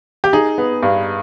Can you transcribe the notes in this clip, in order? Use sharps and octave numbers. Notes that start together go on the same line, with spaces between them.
G4
D#4 G#4
B3
G2